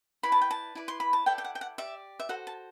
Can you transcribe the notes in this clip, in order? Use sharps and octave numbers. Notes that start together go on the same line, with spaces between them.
E4 B4 D5 B5
A5
G5
A5
E4 B4 D5
C6
B5
A5
E4 A4 D5 G5
G5
F#5
G5
F#5
G4 D5 E5
E5
F#4 A4 C5 F#5
A5